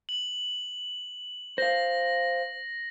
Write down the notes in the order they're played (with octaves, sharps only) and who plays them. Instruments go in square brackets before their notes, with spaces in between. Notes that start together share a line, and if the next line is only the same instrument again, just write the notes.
[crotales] F#7
[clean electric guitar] C5 F5 [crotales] A#6